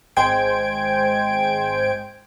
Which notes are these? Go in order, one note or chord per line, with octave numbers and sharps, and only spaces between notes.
G#1 G#3 C5 G5 G#6 D7